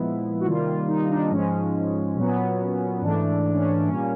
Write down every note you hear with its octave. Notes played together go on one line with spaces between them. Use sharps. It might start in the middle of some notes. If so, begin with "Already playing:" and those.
Already playing: A#2 F3 G#3 B3 E4
F#4
C3 D#3 G3 A#3 F4
F4
D#4
D4
G#2 F3 G#3 C#4
A#2 F#3 B3
G#2 E3 A3 D4
C#4
D4
D4
A#2 G3 A#3 C#4